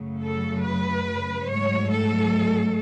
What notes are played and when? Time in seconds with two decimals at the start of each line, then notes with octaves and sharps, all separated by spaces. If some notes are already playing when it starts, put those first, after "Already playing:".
Already playing: F#2 C#3 F#3 A3
0.19 A4
0.62 B4
1.47 G#2 F#3 A3 C#5
1.90 A4